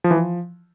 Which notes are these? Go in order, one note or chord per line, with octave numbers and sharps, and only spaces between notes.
F3
E3
F3